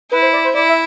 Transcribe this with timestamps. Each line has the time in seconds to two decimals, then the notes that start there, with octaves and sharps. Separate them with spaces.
0.11 E4 B4
0.22 C5
0.33 D5
0.45 C5
0.55 E4 D5
0.69 E5